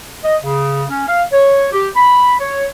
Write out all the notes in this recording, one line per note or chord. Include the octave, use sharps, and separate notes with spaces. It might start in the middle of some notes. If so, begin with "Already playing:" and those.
D#5
C#3
C#4
F5
C#5
G4
B5
C#5